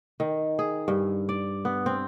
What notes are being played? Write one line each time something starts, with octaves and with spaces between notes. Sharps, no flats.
D#3
G#4
G2
D5
B3
C4